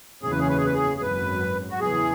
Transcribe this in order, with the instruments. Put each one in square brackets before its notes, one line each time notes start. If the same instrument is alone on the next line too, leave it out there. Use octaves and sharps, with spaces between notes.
[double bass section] F#1 E2 C#3 E3 C#4 [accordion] G#4
[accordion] B4
G#4
B4
G#4
B4
G#4
G#4
[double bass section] G#1 F#2 F#3 [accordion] B4
[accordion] F#4
[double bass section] E2 C#3 E3 [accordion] G#4